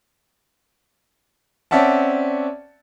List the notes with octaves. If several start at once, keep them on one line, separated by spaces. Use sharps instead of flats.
C4 C#4 D5 E5 F#5 A5